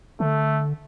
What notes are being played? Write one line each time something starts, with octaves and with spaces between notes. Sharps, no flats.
D3 A3